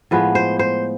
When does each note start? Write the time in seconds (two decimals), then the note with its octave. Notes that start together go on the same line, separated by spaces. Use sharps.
0.11 A2 F3 G#3 B3 B4
0.35 C5
0.59 C5